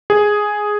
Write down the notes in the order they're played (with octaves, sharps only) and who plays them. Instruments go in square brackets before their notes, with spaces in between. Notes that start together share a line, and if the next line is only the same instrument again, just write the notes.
[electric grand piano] G#4